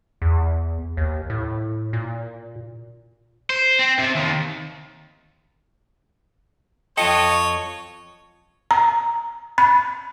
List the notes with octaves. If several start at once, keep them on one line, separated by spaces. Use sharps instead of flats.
E2
D#2
A2
A#2
C5
C4
C3
D#2
F2 F4 A4 C#5 D#5 G5 C#7
A#5
B5